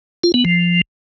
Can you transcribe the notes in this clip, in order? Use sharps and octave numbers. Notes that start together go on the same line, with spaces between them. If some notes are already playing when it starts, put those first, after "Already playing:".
F4
B3
F3